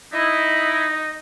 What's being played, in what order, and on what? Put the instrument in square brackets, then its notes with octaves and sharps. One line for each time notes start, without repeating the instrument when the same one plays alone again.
[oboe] D#4 [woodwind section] E4 [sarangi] D#5